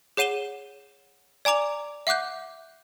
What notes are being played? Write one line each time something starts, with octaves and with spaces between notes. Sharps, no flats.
G#4 C#5 F#5 D#7 E7 G7
D5 G#5 A#5 D6 F7
E5 F#5 D6 F#6 G6